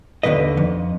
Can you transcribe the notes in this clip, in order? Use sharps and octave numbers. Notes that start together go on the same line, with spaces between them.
D#2 D3 D#3 B4 D#5
F2